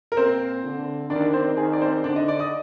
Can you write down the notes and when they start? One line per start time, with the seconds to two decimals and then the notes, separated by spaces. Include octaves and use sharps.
0.12 A#4
0.17 A#2 C4 C5
0.64 D3
1.10 D#3 D4 D5
1.33 C4 C5
1.57 D#3 G#4
1.73 D5
1.81 C4 C5
2.04 D3 D4 D5
2.16 D#4 D#5
2.28 D5 D6
2.39 D#5 D#6